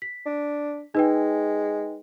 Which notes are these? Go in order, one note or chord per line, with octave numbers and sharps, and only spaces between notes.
B6
D4
G#3 D#4 B4 G5